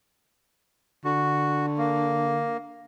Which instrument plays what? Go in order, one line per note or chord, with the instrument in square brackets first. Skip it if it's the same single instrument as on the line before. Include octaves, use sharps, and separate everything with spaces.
[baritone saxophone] D3 [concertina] F#4
[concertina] A#3